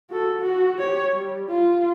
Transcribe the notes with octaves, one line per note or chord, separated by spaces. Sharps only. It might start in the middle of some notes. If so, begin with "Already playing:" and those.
F#4 A4
F#4
G4 C#5
G3
F4